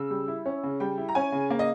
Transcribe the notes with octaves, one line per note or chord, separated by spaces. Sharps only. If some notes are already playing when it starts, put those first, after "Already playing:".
Already playing: C#3 E6
G3
E4
C#4
C#3
G3 G5
E4
A#5
C#4 G#5
C#3
A#3
D#5